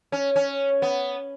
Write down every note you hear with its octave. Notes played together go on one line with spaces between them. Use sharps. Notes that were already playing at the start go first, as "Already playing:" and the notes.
C#4
C#4
B3